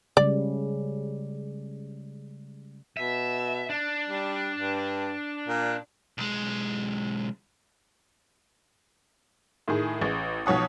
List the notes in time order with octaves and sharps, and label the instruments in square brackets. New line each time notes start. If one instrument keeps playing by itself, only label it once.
[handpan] C#3 G3 G#3 [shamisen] D5
[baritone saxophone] B2 [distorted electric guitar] E5
[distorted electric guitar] D4
[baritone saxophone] G3
G2
A#2
[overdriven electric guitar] B1 G#3
[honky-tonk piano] A2 D#3 G#4
A1
B1 F3 C#5 F#5 D#6